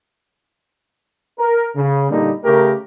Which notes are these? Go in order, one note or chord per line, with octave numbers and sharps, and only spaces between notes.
A#4
C#3
A#2 D3 G3 A#3 D#4
C#3 A3 G4 A#4